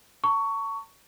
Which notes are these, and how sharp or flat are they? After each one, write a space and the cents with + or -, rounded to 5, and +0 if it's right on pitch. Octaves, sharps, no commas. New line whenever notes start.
A5 +45 C#6 +15